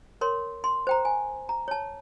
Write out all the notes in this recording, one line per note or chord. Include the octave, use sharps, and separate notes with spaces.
A#4 C#5 C6
C6
C5 G5 A#5
G#5
A#5
C#5 A5